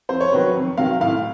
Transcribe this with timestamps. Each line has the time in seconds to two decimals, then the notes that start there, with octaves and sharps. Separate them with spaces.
0.09 F2 C5
0.21 C#5
0.32 C3 D#3 F#3 B4
0.55 F2
0.77 C3 D#3 F#3 F5
1.01 A2 F5